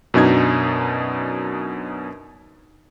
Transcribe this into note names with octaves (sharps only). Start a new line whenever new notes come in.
F#2 B2 D4 D#4 G#6